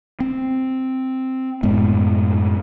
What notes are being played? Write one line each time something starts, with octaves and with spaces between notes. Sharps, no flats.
C4
F#2 A2 G#3 B3